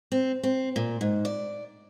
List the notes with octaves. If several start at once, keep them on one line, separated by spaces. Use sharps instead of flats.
C4
C4
A#2
G#2
D5